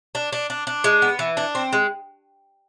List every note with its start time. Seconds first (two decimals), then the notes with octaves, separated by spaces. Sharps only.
0.15 D4
0.32 D4
0.50 D4
0.67 D4
0.84 G#3
1.02 B3
1.19 E3
1.37 D4
1.55 C4
1.73 G#3